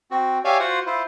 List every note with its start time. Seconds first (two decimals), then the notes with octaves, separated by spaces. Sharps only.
0.11 C4 F#4
0.45 G4 C#5 D5 E5 F5 G#5
0.60 F4 F#4 C5 F#5
0.86 E4 F4 C5